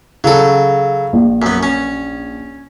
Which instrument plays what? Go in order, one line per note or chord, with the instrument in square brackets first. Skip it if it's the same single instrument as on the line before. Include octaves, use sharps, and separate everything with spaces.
[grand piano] C#3 [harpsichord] F#3 A4
[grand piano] A#1
[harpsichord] F#2 B3
C#4